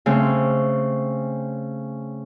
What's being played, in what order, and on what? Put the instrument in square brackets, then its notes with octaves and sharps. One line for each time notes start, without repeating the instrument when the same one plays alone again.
[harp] C#3 A3 C4